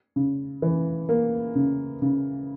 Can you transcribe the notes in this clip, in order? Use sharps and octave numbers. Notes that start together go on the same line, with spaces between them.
C#3
E3
A#3
C#3
C#3